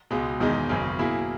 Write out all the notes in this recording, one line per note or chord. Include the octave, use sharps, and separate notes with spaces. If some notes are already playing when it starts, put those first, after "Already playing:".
C#2 B2 G#3
E1 E2 D#3 G#3 D#4
G#1 F#2 C#3
B2 A#3 E4 G#4